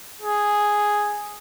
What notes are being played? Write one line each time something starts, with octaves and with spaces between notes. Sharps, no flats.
G#4